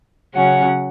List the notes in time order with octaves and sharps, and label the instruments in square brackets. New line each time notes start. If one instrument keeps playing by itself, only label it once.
[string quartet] C#3 F#3 C#4 F#5